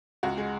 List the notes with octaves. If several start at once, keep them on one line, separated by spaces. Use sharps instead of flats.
C#2 F#4
G#3